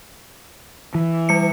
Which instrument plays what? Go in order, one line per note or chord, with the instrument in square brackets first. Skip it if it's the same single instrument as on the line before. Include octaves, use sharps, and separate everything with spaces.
[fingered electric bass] E3
[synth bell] G3 C#7